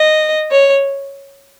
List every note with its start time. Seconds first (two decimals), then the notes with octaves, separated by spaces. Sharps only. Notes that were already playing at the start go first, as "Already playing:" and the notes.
Already playing: D#5
0.51 C#5